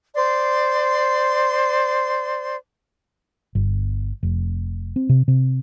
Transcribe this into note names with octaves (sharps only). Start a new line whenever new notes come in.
C5 D5 C6
G1
F1
C4
C3
C3